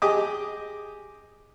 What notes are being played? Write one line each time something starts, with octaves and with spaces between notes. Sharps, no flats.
G4 G#4 D#5 G5 D6 D#6